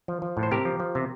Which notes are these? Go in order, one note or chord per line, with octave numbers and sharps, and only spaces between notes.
F3
F3
A2
C5
C3 G4 A#4
F3
F3
C3